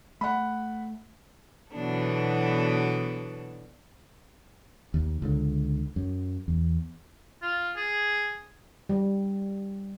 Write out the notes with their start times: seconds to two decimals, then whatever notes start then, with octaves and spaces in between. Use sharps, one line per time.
0.21 A3 F#5 B5
1.72 B2 E3 F#3 B3 D4 A4
4.94 D#2
5.22 C#2 D3
5.96 F#2
6.48 E2
7.42 F4
7.77 G#4
8.89 G3